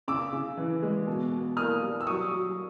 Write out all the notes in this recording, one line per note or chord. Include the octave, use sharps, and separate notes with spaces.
C#3 D6 E6
C#3
E3
G#3
B2
B2
A#3 D#6 F6
G3
E6
F#3 C#6 D#6
F#3